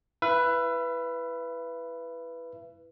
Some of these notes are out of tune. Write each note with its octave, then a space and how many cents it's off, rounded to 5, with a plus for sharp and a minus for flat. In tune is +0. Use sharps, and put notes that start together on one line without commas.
E4 +5 B4 +0 E5 +35